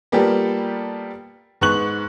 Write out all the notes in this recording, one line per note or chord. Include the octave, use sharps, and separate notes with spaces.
G3 A#3 B3 F4 G4 A4
G#2 B3 C#6 F#6 F#7